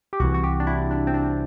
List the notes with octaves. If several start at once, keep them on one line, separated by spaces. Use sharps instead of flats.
G4
C2 C3 E3 F#4
F#4
G4
D4
E4
D4
C4
D4